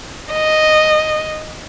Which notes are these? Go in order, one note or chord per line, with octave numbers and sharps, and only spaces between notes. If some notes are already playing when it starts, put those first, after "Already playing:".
D#5